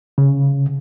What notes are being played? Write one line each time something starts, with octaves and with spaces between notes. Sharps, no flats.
C#3